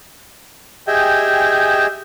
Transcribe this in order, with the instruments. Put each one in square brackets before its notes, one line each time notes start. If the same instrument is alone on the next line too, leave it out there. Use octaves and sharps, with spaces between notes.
[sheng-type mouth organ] G4 G#4 D#5 E5 G5 G#5